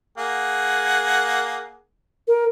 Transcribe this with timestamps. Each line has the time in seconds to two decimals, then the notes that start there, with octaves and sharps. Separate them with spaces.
0.18 A#3 G#4 F#5
2.27 A#4